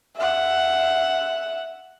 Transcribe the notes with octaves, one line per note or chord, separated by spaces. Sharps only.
E5 F#5